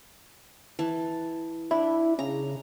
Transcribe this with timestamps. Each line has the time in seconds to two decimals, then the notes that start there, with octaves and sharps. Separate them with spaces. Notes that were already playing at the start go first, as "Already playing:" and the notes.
0.79 E3 A5
1.71 D4 E4
2.19 C#3 A#5